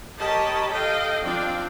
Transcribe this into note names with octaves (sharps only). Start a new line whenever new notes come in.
G4 A#4 C#5 D#5 A5 B5
A4 D#5 F5 G5
F3 C4 D4 D5 F5 G5